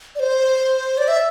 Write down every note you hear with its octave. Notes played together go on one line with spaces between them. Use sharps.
D5
C5
D5
E5